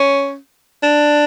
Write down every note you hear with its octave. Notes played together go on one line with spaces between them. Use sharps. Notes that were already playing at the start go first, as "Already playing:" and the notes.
Already playing: C#4
D4